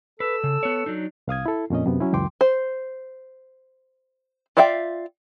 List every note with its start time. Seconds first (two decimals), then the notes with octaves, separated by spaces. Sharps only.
0.20 A4 B4 E6
0.44 C#3
0.63 B3 C#5
0.86 F#3 D4 D#4
1.28 C2 F5 D#6 G#6
1.46 E4 A4
1.70 F2 A#2 C#4 D#5
1.86 F#2 C3 B3
2.01 F#3 C#4 E4
2.13 C#2 F#2 E3 G5 C6 D6
2.41 C5
4.57 F4 D5 E5 F5 G5